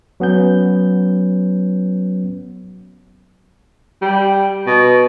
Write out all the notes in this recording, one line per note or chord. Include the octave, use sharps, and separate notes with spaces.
F#3 B3 C#4 G6
G3
B2